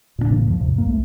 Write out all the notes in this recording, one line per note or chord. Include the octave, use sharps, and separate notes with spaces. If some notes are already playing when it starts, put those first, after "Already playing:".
A#2 C#3 B3 D4
A2 C#3 E3 A#3
D2 G2 D#3 F3
D#2 G#2 C3
F#2 A3 A#3
C2 A3